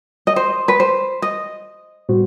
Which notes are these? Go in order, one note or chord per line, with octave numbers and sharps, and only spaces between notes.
D#5
C5
B4
C5
D#5
A2 G3 B3 F#4 C5